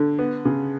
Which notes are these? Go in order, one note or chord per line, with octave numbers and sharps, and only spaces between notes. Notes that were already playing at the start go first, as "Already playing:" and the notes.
Already playing: D3
B3
C#3